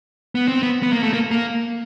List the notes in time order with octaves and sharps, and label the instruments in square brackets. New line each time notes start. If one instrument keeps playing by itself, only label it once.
[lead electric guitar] B3
C4
B3
B3
A#3
A3
A#3
A#3